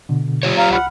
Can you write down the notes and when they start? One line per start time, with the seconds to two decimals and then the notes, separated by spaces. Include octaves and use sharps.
0.09 B2 D3
0.43 F4 G4 C#5
0.58 F5 A#5
0.71 C2 F#5 B5 F6